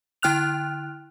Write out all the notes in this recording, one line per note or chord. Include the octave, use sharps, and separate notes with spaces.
D3 E4 G5 F6 F#6 F7